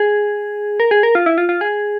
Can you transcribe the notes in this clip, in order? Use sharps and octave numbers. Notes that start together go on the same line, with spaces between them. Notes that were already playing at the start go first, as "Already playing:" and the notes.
Already playing: G#4
A#4
G#4
A#4
F4
E4
F4
F4
G#4